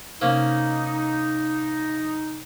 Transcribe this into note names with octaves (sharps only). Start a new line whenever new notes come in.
C3 A#3 C#4 D#4